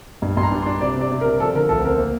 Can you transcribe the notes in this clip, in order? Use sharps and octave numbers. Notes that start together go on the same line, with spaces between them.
G2
G2 C6
A#5
D4
C6
D4
C3 D5
C3
D5
C3
A#4
C3
F3 A4
D3 A#4
D2 A4
C4 A#4
A#3